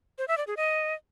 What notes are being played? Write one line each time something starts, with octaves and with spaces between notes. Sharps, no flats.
C5
E5
D5
G#4
D#5